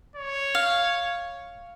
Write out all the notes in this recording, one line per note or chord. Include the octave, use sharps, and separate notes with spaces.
C#5
F5